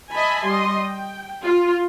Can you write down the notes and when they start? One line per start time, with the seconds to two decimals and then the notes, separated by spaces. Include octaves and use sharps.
0.12 D#5 E5 G#5 A5 B5
0.46 G3 D#5 C6
0.86 G5
1.43 F4